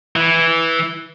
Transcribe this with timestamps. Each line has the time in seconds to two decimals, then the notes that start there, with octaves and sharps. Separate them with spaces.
0.16 E3